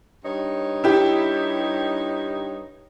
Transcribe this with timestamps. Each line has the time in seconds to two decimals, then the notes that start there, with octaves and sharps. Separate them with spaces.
0.23 G2 D#4 C#5
0.84 E4 G4